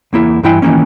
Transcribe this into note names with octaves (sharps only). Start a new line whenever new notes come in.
E2 A#3 E4
G2 E3 E4 G5 C6
D#3 E3 A3 A#3 C#4